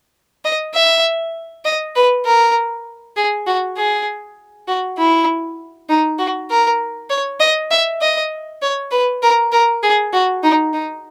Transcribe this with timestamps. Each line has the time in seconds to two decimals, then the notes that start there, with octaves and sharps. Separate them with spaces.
0.45 D#5
0.74 E5
1.65 D#5
1.96 B4
2.26 A#4
3.16 G#4
3.47 F#4
3.77 G#4
4.68 F#4
4.98 E4
5.89 D#4
6.19 F#4
6.50 A#4
7.10 C#5
7.40 D#5
7.71 E5
8.01 D#5
8.62 C#5
8.91 B4
9.22 A#4
9.52 A#4
9.83 G#4
10.13 F#4
10.43 D#4
10.73 D#4